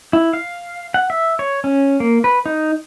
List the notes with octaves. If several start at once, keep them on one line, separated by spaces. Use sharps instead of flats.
E4
F5
F#5
E5
C#5
C#4
A#3
B4
D#4